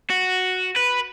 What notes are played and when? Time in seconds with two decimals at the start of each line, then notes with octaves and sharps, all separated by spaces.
0.10 F#4
0.76 B4